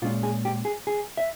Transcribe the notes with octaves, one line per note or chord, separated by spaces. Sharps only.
A#2 G#3 C#4 F4
G#4
G4
G#4
G#4
E5